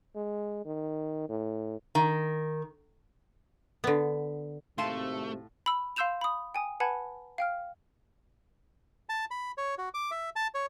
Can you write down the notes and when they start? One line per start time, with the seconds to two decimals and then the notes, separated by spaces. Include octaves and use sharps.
0.16 G#3
0.65 D#3
1.29 A2
1.95 D#3
3.84 D3 B3
4.78 G#1 A2 C3 A3 F5 A5 C6
5.66 B5 E6
5.96 F5 C6 E6 G6 E7 F7
6.21 B5 D#6
6.54 G5 G#5 D#6
6.80 B4 F#5 G#5 A5 B5 G#6
7.38 F5 G5 F6
9.09 A5
9.31 B5
9.58 C#5
9.78 F#4
9.94 D6
10.11 E5
10.36 A5
10.54 C#5